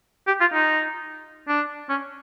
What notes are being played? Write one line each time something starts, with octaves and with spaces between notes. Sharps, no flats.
G4
F4
D#4
D4
C#4